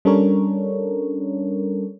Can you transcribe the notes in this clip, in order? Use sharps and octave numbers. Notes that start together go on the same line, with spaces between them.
G3 C#4 D4 A4 A#4 C#5